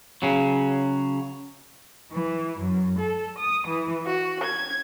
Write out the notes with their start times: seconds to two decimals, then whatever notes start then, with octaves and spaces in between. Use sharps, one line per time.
0.22 C#3 F#3
2.11 E3
2.59 F#2
2.98 A4
3.38 D#6
3.67 E3
4.05 F#4
4.43 G#6